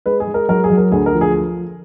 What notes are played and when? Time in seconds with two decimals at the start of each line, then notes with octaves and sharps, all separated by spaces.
0.06 G#3 B4
0.20 G#4
0.27 G#3
0.34 A#4
0.49 F#3 A#4
0.64 G#4
0.70 F#3
0.77 A#4
0.92 D2 G#4
1.06 A#4
1.14 F3
1.21 G#4